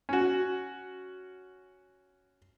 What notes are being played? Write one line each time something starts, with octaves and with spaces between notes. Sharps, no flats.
C#4 F#4